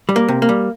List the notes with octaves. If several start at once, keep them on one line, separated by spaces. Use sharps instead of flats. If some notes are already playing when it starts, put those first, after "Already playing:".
G3
A#3
C3
A#3
G3